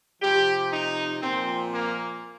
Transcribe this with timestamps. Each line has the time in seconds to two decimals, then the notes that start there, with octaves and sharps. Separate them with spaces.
0.22 C3 F3 G4
0.72 D#4
1.23 A#2 F3 C4
1.73 A#3